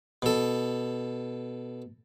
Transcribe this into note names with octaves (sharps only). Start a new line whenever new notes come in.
B2 A4